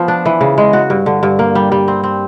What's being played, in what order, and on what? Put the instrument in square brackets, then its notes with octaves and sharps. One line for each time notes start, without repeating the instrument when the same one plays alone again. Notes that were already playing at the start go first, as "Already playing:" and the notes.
Already playing: [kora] F3 B3
D4
E3
C#3
G#3
F#4
G2
D3
G2
A#3
G3
G3
C4
C4